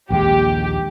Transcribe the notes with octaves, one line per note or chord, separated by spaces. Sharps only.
A#1 D#2 G#3 G4